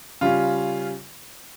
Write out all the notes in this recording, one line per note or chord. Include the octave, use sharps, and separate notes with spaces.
C#3 G3 C#4 F4